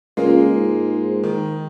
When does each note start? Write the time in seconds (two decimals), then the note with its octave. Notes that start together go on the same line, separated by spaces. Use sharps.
0.17 C#2 G#3 A#3 F4
0.55 G#2
1.24 D#3